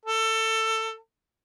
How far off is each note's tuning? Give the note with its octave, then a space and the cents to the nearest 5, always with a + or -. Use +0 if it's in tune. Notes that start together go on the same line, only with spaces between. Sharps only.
A4 +20